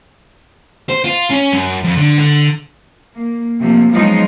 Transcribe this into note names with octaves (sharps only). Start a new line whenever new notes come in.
C5
F4
C#4
F#2
F2
D3
D3
A#3
C3 F3 A3 A#3
F3 F#3 G#3 B3 D#4 F4